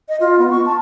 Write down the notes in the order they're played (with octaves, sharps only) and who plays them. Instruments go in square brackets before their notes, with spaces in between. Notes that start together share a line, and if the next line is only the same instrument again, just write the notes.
[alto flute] D#5
F4
B3
C#6
A5